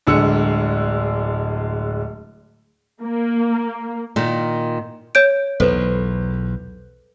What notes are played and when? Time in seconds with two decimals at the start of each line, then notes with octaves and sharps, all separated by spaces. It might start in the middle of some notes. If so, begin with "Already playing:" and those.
0.07 D1 D3 G#3 E6 C#7
3.02 A#3
4.16 A#2 D#3
5.15 C#5 G6 D7
5.60 B1 E2 A4 B4 C5